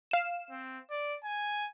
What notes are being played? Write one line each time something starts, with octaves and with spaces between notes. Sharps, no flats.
F5 E7
C4
D5
G#5